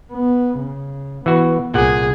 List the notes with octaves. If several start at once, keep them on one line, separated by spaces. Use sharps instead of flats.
B3
C#3
E3 B3 F#4
C2 A#2 G#4 F#5